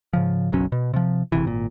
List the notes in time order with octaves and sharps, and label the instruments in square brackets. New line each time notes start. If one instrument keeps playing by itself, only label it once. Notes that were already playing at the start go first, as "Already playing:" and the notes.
[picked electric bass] G#2 C#3 F3
F#1 B1 F#3 C#4
B2
C3 F3
F#1 C3 E3
G#1 A#2